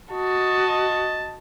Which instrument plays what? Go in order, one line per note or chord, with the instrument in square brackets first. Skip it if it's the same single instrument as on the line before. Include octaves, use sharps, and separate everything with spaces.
[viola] F#4 [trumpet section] D#5 A5